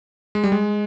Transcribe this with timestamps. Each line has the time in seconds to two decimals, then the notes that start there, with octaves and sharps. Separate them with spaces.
0.35 G#3
0.44 G3
0.52 G#3